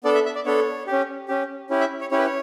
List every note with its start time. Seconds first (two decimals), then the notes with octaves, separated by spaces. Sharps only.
0.04 B3 D4 A4 D5
0.15 E5
0.25 E5
0.35 D5
0.46 B3 D4 A4 C#5
0.87 C#4 G4
1.28 C#4 G4
1.70 C#4 E4 G4
1.80 E5
2.01 C#5
2.11 C#4 E4 G4 C#5
2.18 B4
2.26 C#5